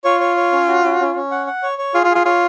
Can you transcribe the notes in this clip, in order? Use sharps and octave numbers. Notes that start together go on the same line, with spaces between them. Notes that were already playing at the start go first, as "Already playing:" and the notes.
F4 C#5
C#5
C#5
C#4
F#4
C#4
C#4
C#4
F#5
F#5
C#5
C#5
F4 G#4
F4
G#4
F4
F4 C#5